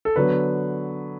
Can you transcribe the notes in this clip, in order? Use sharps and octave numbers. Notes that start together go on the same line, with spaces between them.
A4
D3 F#3 B3 B4